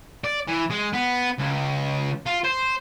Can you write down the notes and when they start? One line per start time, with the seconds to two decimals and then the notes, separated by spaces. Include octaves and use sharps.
0.24 D5
0.48 E3
0.71 G#3
0.94 B3
1.38 C#2
2.26 F4
2.44 C5